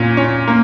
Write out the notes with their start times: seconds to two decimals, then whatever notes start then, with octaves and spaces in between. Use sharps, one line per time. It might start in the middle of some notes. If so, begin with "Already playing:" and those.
Already playing: A#2 C#4
0.17 C#4
0.48 A#3